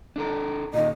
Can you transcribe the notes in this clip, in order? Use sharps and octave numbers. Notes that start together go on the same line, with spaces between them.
D4 A4 A#4
A#2 D#3 D#5